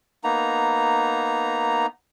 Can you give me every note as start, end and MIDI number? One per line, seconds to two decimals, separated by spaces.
0.24 1.86 58
0.24 1.86 59
0.24 1.86 63
0.24 1.86 82